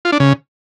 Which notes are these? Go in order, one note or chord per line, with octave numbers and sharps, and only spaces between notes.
F4
D4
C#3